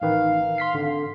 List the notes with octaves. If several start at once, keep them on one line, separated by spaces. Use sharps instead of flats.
A1 D#3 B4 F5
C6 B6 C7
G#1 D3